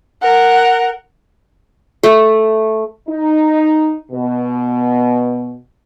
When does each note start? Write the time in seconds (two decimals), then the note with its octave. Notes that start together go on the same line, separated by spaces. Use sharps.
0.22 A#4 F#5
2.03 A3
3.09 D#4
4.11 B2